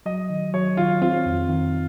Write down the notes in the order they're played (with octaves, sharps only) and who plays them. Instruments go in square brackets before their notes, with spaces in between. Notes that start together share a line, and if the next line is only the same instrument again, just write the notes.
[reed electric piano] F#3 [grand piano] D#5
[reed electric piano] D#3
[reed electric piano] F#3 [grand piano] C#5
[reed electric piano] D#3 [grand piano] F4
[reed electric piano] C4 [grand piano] F4
[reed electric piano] F2
D#3